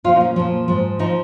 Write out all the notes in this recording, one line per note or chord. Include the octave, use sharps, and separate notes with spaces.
A#2 F3 F4
D#4
C#4
A#2 F3
G#2 F3
F3 D#4